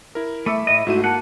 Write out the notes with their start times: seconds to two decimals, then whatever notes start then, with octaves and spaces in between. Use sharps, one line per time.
0.15 E4 A#4
0.46 A3 E5 B5 D6 E6
0.67 A2 D#5
0.87 G#2 A3 E4 F#4 D#7
1.04 A#3 F#5 A5